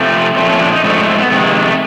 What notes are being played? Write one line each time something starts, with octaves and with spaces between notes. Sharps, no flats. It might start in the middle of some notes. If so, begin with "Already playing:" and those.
Already playing: C3 F3 A3
A#2 F3 A3 C4
C#4
D4
D#4
G#2 F3 A3 D4
D4
C4
B3
F2 C3 D#3 G#3 B3
A#3
A3